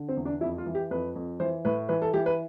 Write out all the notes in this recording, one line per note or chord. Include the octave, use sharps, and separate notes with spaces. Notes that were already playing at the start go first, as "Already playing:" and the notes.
Already playing: D3
C4
E2
D4
F2 E4
F4
E3
G4
F2 B4
F2
E3 C5
A2 B4
E3 B4
A4
E3 G4
B4